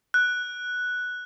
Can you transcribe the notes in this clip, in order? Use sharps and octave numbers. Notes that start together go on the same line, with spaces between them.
F#6